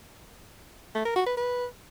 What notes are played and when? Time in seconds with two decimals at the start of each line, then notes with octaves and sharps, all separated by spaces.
0.95 A3
1.05 A#4
1.16 F#4
1.26 B4
1.37 B4